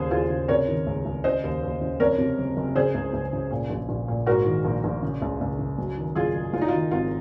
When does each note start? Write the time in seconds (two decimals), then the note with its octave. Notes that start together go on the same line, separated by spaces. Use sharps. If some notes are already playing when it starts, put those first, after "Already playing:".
Already playing: D#2 C#3 G#4 C5
0.11 D#2 F4 G#4
0.30 C#3
0.48 C3 A#4 C#5
0.68 D#3
0.87 C#2
1.05 C#2
1.24 C#3 C5 D#5
1.44 D#2
1.63 D#2
1.81 C#3
2.00 F2 A#4 C#5
2.18 C3
2.38 F#1
2.57 F#1
2.75 C#3 G#4 C5
2.94 C#2
3.13 C#2
3.33 C#3
3.51 A#2
3.70 A#1
3.89 A#1
4.08 A#2
4.26 G#2 F#4 A#4
4.46 D#3
4.65 A#1
4.84 A#1
5.03 C#3
5.22 C#2
5.41 C#2
5.59 C#3
5.78 F#2
5.97 D#3
6.15 F#1 F4 G#4
6.35 F#1
6.53 F#2 F4
6.61 D#4
6.68 F4
6.73 D#3
6.91 G#1 F4